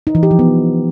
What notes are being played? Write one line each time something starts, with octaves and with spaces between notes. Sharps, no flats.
D#4
E3
G4
F3
B3